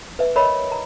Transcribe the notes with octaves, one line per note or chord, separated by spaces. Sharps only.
B4 E5
A#4 C#5 D#5 E5 B5
A#5